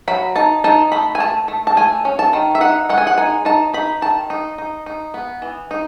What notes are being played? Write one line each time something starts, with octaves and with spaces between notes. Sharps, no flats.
F#3 B5
D#4 A5
D#4 A5
A3 B5
G#5
A3 A5
A3
A5
A3 G#5
C#4
A5
D#3
E5
D#4 F#5
G#3 F#5
G#5
F#5
D#4 G#5
D#4 A5
D#4 B5
D#3 A5
D#4
D#4
D#4
B3
E3
D#4